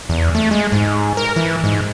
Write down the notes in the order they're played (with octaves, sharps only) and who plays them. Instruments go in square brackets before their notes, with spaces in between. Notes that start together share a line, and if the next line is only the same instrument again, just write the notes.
[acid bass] E2
A3
G#3
G#2
A#4
E3
G#2